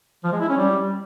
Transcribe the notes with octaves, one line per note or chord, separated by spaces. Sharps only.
F3
G#3
E4
C#4
G3